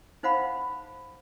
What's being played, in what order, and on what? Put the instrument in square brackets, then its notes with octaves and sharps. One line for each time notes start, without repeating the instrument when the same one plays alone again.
[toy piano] D#4 C5 F5 F#5 B5